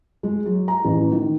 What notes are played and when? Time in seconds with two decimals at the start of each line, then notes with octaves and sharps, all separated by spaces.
0.23 G#3
0.46 F#3
0.68 A#5
0.85 A1
1.12 D#3